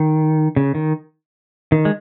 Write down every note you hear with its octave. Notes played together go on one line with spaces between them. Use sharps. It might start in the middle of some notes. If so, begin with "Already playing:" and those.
Already playing: D#3
C#3
D#3
D#3
G#3